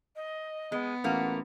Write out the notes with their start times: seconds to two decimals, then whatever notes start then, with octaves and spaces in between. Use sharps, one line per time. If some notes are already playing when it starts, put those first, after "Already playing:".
0.15 D#5
0.72 G#3 B3
1.04 A1 E3 A#3 F4 F#5